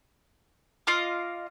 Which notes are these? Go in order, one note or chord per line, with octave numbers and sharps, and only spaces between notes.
F4 D#5 F5 D6